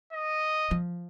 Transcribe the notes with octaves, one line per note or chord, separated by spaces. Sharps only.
D#5
F3